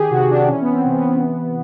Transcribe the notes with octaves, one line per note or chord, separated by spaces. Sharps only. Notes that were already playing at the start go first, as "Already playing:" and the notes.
Already playing: D#3 G4 G#4
C3 F#4
D4
E3 C#4
B3
C4
C3
B3
E3